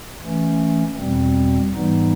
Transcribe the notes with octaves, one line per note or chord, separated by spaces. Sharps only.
E3 A3 C#4
E2 B2 G3 C4
G#2 E3 G3 B3 D#4